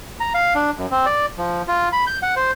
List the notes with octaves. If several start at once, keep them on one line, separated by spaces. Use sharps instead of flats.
A#5
F5
D4
F#2
C4
D5
F3
F4
B5
G6
F#5
C5